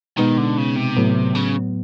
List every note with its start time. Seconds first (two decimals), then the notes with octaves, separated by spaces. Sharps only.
0.18 B2 D#3 G#3 B3 D#4
0.38 D3
0.58 C#3
0.76 C3
0.97 A2 F#3 B3
1.35 C#3